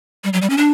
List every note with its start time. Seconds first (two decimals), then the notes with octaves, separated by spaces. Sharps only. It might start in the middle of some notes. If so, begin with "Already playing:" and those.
0.24 G3
0.33 F#3
0.42 G3
0.50 C#4
0.57 D4